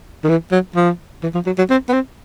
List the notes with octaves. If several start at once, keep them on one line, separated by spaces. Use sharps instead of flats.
D#3
E3
F#3
F3
E3
F3
F#3
F#3
C4
B3
C4